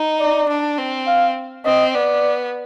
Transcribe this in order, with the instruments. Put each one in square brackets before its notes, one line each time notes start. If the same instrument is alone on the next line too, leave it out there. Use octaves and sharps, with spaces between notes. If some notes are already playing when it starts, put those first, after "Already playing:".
Already playing: [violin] D#4
[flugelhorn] D5
[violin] D4
C4
[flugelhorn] F5
[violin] C4 [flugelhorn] D#5
[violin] B3 [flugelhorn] D5